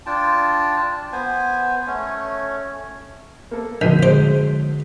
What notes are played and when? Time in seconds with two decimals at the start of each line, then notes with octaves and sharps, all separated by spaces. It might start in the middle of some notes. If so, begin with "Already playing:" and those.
0.06 D4 F4 G5 A5
1.12 B3 C5 G#5
1.87 A3 C#4 C#5
3.51 A#3 A4
3.81 A#1 D3 C4 F#4 G6 B6 D#7
4.03 G#3 C5 C6 D7